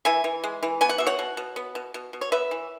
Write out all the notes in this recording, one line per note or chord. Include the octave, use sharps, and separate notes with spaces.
E3 E5 G#5
E3
G#3
E3
B3 G#5
F#5
B2 E5
C#5 F#5
B2
B2
B3
B2
B2
B2
C#5
B3 B4 E5
E3